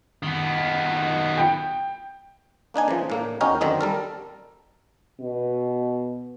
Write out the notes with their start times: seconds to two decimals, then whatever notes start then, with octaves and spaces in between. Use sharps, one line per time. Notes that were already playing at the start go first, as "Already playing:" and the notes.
0.23 D#3 B3
1.38 G5
2.74 A#3 D4 D#4 G#5
2.88 C#3 E3 F3
3.10 A2 A#3 D4
3.41 E2 C#4 D#4 F#4 A#4 G5
3.61 F#2 D3 D#3 C4 D#4
3.81 G3 A4 A#4
5.20 B2